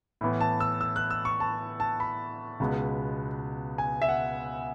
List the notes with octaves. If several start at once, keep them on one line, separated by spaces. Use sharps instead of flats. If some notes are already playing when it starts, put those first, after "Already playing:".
A2 E3 B3
A5
E6
E6
F#6
E6
C#6
A5
A5
B5
C#2 B2 G#3 B3
G#5
E5
F#5